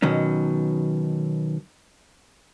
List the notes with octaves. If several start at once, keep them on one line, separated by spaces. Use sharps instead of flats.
B2 D#3 F#3 C#4